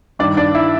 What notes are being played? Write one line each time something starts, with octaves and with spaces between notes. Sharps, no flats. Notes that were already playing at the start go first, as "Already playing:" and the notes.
G2 D#3 D4 D5
D4 D5
E4 E5